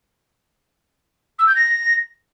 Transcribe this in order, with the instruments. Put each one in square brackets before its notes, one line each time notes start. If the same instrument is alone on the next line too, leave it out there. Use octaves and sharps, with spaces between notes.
[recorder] E6
G6
A#6